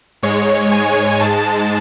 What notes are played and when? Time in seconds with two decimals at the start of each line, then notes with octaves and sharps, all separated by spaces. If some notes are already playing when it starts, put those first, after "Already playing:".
0.23 G#2 G#3 C#5
0.72 G#5
1.20 G#2 G#3 A5